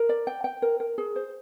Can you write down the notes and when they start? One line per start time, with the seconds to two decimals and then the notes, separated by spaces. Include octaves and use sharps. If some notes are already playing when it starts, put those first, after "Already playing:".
Already playing: A#4
0.09 D5
0.27 G5
0.44 G5
0.62 A#4
0.80 A#4
0.98 G#4
1.16 C5